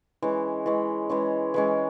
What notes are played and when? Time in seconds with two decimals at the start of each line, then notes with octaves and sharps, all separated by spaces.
0.22 E3 G#3 C#4
0.66 E3 G#3 C#4
1.09 E3 G#3 C#4
1.54 E3 G#3 C#4